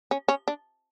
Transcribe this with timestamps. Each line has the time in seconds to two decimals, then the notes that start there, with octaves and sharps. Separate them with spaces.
0.11 C#4
0.28 C#4
0.48 D4